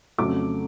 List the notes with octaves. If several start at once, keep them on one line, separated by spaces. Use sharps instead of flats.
F2 C#3 F#3 A3 D6